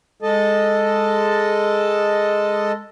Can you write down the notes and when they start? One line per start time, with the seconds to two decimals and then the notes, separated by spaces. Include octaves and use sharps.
0.22 G#3 A4 D#5 A5